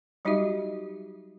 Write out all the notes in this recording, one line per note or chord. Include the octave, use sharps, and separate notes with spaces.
F#3 G3 D#4 F#4 G4 E5